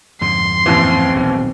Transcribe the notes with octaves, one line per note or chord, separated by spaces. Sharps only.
F2 G#2 D3 C6
A1 D#2 E3 C4
D#1 B1 B2